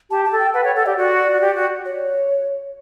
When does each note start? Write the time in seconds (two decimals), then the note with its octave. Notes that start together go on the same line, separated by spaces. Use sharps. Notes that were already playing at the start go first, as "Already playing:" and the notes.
0.10 G4 A5
0.25 A5
0.32 A4
0.39 G5
0.54 B4 F#5
0.64 C#5 G5
0.75 A4 F#5
0.86 G4 D5
0.97 F#4 D5
1.33 F#4
1.41 G4
1.55 F#4
1.85 C#5